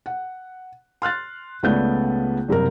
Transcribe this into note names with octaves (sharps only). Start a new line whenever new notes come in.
F#5
C6 F6 F#6 A6
C#2 C#3 A3 B3 D5 G6
F#1 C3 G3 A#4